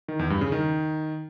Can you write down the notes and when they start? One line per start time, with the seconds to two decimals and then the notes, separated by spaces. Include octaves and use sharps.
0.08 D#3
0.19 E2
0.30 G2
0.41 C#3
0.52 D#3